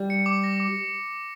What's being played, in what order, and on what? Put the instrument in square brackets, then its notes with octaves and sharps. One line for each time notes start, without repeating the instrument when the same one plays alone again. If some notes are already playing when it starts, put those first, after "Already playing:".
Already playing: [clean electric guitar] G3
[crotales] C#7
D6
A#6
D6